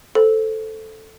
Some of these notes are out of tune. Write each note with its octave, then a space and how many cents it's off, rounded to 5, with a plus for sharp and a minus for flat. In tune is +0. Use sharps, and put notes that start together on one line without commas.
A4 +0 C5 +0